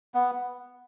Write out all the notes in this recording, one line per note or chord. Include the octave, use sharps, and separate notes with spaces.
B3